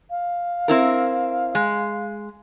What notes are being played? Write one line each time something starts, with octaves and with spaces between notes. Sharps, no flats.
F5
C4 E4 A#4
G#3